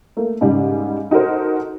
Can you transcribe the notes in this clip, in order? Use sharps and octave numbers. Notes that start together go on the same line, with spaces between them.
A3 A#3
G#2 C#3 G3
D#4 F#4 A4 A#4 C5